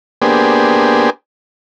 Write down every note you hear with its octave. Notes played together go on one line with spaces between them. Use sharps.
A#3 B3 D4 G4 G#4 C5